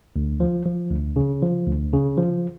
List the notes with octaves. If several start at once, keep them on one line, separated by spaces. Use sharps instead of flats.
D2
F3
F3
D2
C#3
F3
D2
C#3
F3